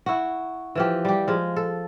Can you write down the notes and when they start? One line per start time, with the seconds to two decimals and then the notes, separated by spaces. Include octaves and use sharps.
0.06 E4 F#4
0.75 E3 F3 G4
1.05 G3 G4
1.28 F3 G#3
1.56 A4